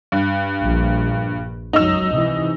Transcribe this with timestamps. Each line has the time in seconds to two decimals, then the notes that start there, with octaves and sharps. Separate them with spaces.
0.12 G2
0.63 A#1
1.73 C#2 F#2 F#3 D#4 E6
2.10 C3 E3